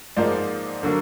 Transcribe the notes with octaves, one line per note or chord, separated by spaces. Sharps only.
G#2 F3 A#3 D#4 C5 D5
D3 F#3 A#3